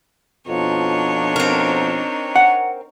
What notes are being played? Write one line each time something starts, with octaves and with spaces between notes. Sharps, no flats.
F2 B2 F3 D4 D#4 C#5
C4 A#4
F#5